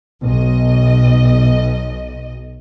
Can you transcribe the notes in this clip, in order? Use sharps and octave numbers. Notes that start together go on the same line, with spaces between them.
B1 D#5